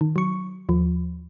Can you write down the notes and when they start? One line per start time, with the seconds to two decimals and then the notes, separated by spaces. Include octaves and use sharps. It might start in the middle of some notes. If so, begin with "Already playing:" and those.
0.01 D#3
0.16 F#3 C#6
0.69 D#2 F3